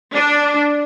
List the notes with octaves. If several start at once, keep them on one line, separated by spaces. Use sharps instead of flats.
D4